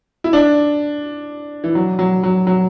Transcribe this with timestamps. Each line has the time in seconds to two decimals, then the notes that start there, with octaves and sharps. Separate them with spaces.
0.24 E4
0.33 D4
1.64 E3
1.75 F#3
1.99 F#3
2.23 F#3
2.47 F#3